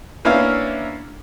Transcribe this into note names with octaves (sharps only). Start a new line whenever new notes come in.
A#3 B3 C#4 D4 E4 F5